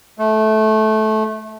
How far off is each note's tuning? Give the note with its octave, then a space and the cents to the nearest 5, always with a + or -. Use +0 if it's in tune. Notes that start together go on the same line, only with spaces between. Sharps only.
A3 -20